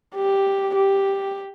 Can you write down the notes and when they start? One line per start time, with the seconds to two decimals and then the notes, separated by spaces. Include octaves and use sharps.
0.15 G4
0.75 G4